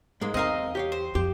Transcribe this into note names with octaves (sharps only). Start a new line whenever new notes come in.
G#2 G#3 A#3
E2 C4 D#4 A#4 D#5 F5
G4 C#5 F5
C5
F2 G4